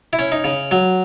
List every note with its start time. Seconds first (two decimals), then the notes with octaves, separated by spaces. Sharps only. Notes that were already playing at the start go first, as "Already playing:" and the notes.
0.13 E4
0.19 C#4
0.32 D#4
0.44 C#3
0.71 F#3